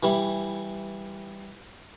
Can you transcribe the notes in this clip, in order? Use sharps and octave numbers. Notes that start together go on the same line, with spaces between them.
E3 G3 E4